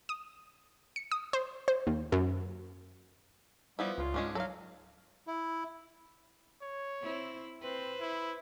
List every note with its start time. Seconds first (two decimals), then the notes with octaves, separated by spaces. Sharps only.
0.09 D#6
0.96 C#7
1.12 D#6
1.33 C5
1.68 C5
1.87 D#2
2.12 F#2
3.79 F3 G3 B3 E4
3.98 C#2 F4
4.14 G#2 G#3 C#4 D4
4.35 F#3 A4 F5
5.27 E4
6.62 C#5
7.02 C4 E4
7.62 C4 B4 C5
8.00 E4